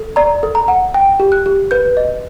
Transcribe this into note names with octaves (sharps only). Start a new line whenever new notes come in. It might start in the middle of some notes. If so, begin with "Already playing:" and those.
Already playing: A4
D5 A#5
A4
A#5
F#5
G5
G4
F#6
G4
B4 G6
D#5